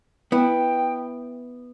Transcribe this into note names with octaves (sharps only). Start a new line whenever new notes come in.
B3 E4 G5